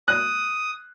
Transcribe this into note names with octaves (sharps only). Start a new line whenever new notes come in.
D#6 F#6